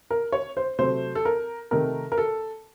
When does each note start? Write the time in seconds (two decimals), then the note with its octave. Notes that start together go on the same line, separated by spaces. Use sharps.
0.11 A#4
0.32 C#5
0.57 C5
0.79 C3 F#3 A3 C5
1.15 A4
1.25 A#4
1.71 C3 D#3 A3 A#4
2.12 A#4
2.18 A4